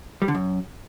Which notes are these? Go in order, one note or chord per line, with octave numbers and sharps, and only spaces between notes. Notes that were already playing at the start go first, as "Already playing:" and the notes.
G3
D3
F#2